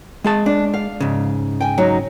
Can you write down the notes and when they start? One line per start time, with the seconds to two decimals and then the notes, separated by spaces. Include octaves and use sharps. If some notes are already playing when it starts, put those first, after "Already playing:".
0.24 G#3 G#4 A5
0.46 D4
0.74 F5
1.00 G#2 C#3
1.61 G5 G#5
1.78 F#3 D#4 F#4